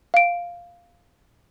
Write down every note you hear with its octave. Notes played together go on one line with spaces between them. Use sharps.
F5 D7